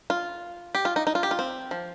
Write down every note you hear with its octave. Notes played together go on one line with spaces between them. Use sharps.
F4
G4
F4
D#4
D#4
F4
G4
F4
C4
F3